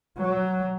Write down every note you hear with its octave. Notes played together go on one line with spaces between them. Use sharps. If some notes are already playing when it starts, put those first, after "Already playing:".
F#3